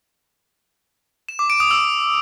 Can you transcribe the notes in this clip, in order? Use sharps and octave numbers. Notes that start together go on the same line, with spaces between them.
E7
D6
D7
D#6
E6